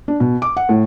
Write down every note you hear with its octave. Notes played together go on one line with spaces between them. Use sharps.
D4
B2
D6
F#5
A2